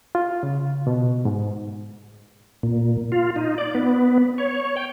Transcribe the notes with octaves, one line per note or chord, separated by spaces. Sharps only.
F4
C#3
B2
G#2
A#2
F4
D#4
D5
B3
C#5
G5